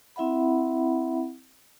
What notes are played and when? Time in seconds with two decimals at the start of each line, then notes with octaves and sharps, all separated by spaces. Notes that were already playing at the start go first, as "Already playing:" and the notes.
0.16 C4 E4 E5 F#5 B5